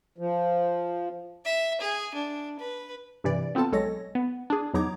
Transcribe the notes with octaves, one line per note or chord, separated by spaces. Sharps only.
F3
E5
G#4
D4
B4
G2 C3 E3 D5
B3 C4 F4 A4 A5
B1 G#3 A4 C#5 A#6
B3
D4 G#4
E2 F#3 D#4 A#5 D6 G#6